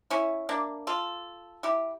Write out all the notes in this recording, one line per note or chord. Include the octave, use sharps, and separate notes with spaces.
C#4 E4
A#3 D4
F4 A4
E4 G4